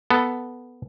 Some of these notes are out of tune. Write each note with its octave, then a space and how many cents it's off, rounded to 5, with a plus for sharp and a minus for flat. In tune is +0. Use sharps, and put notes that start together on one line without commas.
B3 +0 A4 +0